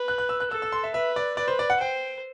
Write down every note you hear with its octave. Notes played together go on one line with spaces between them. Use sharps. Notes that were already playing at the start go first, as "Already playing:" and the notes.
Already playing: B4
F#6
F#6
E6
F#6
A4 E6
E6
C6
E5
B4 E5
D5
B4 D5
C5
D5
F#5
C5 G5